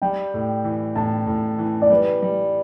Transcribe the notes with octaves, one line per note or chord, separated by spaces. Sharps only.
G3 G5
A2
E3
A2 A5
A2
E3
D5
G3 B4
G3